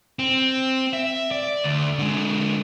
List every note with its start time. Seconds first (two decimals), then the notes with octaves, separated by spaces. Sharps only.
0.19 C4
0.93 E5
1.31 D5
1.64 D2
1.99 D3 G#3